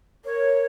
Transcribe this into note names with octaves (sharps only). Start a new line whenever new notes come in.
A#4 C#5